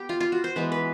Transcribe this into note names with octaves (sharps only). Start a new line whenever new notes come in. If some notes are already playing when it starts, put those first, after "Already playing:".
Already playing: B3 G4
F4
F4
F#4
C5
E3 G#3 B3 B4
B4